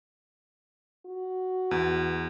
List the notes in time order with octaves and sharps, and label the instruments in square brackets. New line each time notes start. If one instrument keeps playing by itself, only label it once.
[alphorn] F#4
[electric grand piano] E2